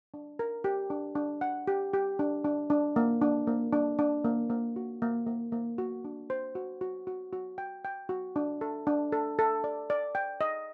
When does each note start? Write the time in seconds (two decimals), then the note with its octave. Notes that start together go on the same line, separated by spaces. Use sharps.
0.14 D4
0.39 A#4
0.64 G4
0.90 D4
1.15 D4
1.41 F#5
1.68 G4
1.94 G4
2.19 D4
2.45 D4
2.70 D4
2.96 A#3
3.22 D4
3.47 A#3
3.72 D4
3.99 D4
4.24 A#3
4.50 A#3
4.76 F#4
5.02 A#3
5.27 A#3
5.52 A#3
5.78 F#4
6.05 D4
6.30 C5
6.55 F#4
6.81 F#4
7.07 F#4
7.33 F#4
7.58 G5
7.85 G5
8.09 F#4
8.36 D4
8.61 A4
8.87 D4
9.12 A4
9.39 A4
9.64 D5
9.90 D5
10.15 G5
10.41 D#5